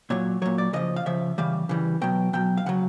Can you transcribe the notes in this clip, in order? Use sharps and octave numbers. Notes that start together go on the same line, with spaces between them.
A#2 F#3 C#5
A#2 F#3 C#5
D5
C#3 F3 D#5
F5
C#3 F3 E5
C#3 E3 G3 F5
C#3 E3 G3
B2 F#3 G5
B2 F#3 G5
F5
C#3 F#3 F#5